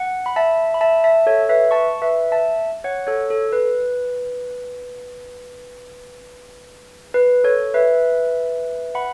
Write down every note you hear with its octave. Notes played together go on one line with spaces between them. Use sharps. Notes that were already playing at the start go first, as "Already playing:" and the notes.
Already playing: F#5
B5
E5 A5
B5
E5 A5
E5 A5
A4 C#5
B4 E5
A5 C#6
B4 E5
E5 A5
C#5 F#5
A4 C#5
A4
B4
B4
A4 C#5
B4 E5
F#5 B5